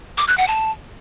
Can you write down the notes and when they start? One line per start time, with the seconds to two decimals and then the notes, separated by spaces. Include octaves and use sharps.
0.18 D6
0.28 F#6
0.38 F#5
0.48 A5